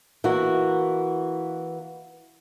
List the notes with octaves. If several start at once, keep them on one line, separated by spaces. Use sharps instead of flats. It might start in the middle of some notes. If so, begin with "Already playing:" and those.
E3 A#3 F#4